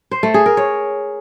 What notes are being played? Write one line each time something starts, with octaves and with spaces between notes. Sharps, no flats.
C5
A3
G#4
A#4
C#5